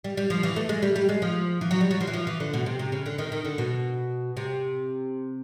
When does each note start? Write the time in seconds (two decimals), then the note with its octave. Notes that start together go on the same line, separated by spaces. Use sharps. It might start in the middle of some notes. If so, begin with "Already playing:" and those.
0.04 G3
0.17 G3
0.30 F3
0.43 E3
0.56 A3
0.69 G#3
0.82 G3
0.96 G3
1.09 G#3
1.22 F3
1.61 E3
1.71 F#3
1.81 G3
1.91 F#3
2.01 F3
2.07 E3
2.13 F3
2.27 E3
2.40 D3
2.54 B2
2.66 C3
2.79 C3
2.92 C#3
3.06 D3
3.18 D#3
3.32 D#3
3.45 D3
3.58 B2
4.37 C3